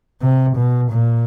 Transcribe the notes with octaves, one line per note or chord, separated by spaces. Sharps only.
C3
B2
A#2